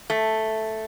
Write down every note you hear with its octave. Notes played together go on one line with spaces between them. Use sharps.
A3